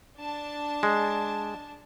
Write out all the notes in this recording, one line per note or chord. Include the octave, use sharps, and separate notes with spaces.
D4 A5
G#3